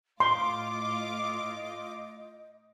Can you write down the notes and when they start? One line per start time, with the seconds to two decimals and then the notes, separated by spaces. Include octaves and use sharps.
0.20 A2 F4 D#5 C6 D6